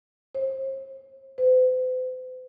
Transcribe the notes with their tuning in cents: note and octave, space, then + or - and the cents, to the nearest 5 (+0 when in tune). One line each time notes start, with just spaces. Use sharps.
C5 +45
C5 -45